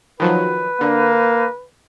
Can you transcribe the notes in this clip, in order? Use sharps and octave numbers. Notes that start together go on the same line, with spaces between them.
D#3 F3 F#3 B4
D3 A#3